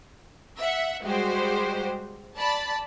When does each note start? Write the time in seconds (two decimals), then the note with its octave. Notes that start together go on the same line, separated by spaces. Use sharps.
0.59 E5 F#5
1.03 G3 G#3 F#4 G4 C5
2.37 D5 A5 B5 A6